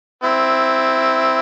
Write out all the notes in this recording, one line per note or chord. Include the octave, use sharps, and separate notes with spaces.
C4 E4